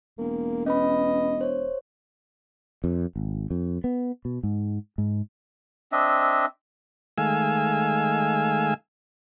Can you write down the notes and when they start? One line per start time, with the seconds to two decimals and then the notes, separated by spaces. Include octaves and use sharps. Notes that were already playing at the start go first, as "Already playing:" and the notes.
0.18 E1 A#3
0.66 C#4 B4 D#5 B5
1.41 C5 C#5
2.84 F2
3.16 G#1
3.51 F2
3.84 B3
4.25 B2
4.43 G#2
4.98 G#2
5.92 C4 D4 D#5 E5
7.18 D#3 G#3 A3 F5 G#5 E6